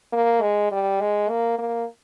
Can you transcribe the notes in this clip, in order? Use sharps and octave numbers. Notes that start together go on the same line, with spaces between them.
A#3
G#3
G3
G#3
A#3
A#3